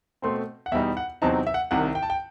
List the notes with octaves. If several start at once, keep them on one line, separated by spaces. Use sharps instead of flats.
B2 A3 C4 C6
F#5
E2 B2 G3 D#4 E5
F#5
E2 C3 F#3 C4 D#4 A5
E5
F#5
C2 C3 D#3 F#5
G5
A5
G5